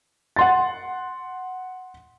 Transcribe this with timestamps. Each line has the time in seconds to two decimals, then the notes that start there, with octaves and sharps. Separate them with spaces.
0.36 F#5 C6 A6